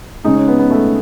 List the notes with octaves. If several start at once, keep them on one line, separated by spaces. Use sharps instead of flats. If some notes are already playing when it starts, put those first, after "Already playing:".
C#3 G#3 D#4
C#4
B3
B3
A3